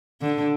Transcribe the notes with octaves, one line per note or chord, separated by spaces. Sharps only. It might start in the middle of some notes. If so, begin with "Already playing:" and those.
D3